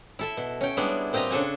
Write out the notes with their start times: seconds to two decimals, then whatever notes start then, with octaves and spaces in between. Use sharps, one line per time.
0.19 E4 A4 E5
0.37 B2
0.61 C#4 G5
0.77 G3 G#3 B3 D4 E4
1.13 A#2 C4 G4 D#5 A#5
1.30 C#3 D4 A4 F#5 G#5